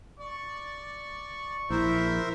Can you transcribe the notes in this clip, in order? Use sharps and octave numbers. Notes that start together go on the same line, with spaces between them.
D5 C#6
A#1 E4 A#4 C5 E5